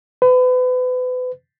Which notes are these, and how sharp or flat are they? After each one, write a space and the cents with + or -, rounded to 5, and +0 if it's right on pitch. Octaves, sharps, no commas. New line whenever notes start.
B4 +35